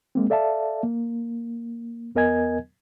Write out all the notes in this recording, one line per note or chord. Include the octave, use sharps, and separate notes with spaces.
G#3 A#3 C4
A4 D5 E5 F5 A5
A#3
E2 B3 A#4 D#5 G#5 G#6